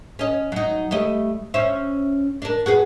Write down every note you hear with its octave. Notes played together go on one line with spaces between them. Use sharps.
C#4 D#5
F#3 D#4
G3 A3 D#5
C#4 C5 E5
D4 A#4
F#4 G#4 B4